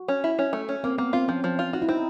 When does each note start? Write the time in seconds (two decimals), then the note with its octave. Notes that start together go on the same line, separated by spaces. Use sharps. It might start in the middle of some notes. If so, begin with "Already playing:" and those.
Already playing: F#4
0.08 C#4
0.24 E4
0.39 C#4
0.53 A3
0.69 C#4
0.84 A#3 C4
0.98 A#3 B3
1.13 C4 F4
1.28 F3 C#4
1.44 F3
1.59 F4
1.73 D#4 F#4
1.82 E4
1.89 C4 D#4